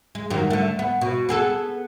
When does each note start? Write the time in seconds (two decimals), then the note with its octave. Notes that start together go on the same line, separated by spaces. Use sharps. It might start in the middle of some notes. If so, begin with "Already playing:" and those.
0.15 G#3
0.30 F#2 D#3 G3
0.50 D3 A3
0.79 B3
1.01 B2
1.29 B3 G#4 A4